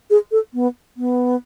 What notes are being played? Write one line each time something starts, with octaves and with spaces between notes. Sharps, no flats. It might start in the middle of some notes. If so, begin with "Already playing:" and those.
G#4
A4
B3
B3